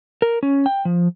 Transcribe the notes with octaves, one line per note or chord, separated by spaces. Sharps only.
A#4
C#4
G5
F3